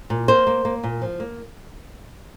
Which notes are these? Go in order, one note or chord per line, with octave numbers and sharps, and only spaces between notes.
A#2
A#3 C5
A#3
A#3
A#2
F3
A#3